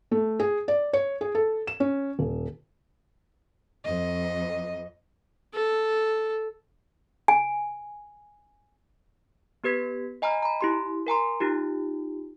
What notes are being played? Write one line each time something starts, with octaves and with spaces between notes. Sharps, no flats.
A3
G#4
D5
C#5
G#4
A4
E7
C#4
D#1
F2 D#5
A4
G#5
B3 G4 B4 G#6 B6
D#5 G#5 A#5 B5 F6
A#5 B5
E4 G4 C6
A#4 G#5 A#5 C6
D#4 F4 G4